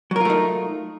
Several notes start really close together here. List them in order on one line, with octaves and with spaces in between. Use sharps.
F#3 A#4 F4 A3 D#4